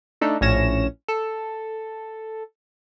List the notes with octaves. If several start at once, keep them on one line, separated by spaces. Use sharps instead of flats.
A3 D4 D#4 A4
A#1 A2 C#4 C#5 A#6 E7
A4